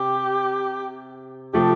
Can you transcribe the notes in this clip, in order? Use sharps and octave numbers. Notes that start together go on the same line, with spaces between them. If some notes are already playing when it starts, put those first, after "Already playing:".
Already playing: C3 G4
C3 F3 A3 G4